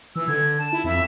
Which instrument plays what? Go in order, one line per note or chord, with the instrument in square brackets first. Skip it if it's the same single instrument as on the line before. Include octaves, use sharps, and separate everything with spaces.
[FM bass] E3 [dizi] E6
[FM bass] D3 [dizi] G#6
[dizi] A5
[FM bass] E4
[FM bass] F2 [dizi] E5